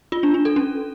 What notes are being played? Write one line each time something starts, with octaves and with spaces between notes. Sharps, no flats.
F4
D4
D4
A4
C#4